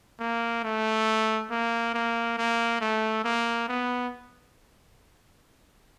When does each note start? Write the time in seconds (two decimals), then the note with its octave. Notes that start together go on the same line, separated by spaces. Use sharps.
0.20 A#3
0.64 A3
1.51 A#3
1.94 A#3
2.38 A#3
2.81 A3
3.24 A#3
3.68 B3